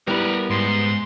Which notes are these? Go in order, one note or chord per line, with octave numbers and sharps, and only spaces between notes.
G3 B3 E4 A#4 B4
G#2 C6